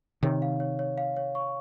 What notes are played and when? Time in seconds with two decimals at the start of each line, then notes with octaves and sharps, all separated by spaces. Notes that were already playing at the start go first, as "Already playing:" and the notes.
0.23 C3 D#3 C#5
0.42 F5
0.60 C#5
0.79 C#5
0.98 F5
1.17 C#5
1.35 C#6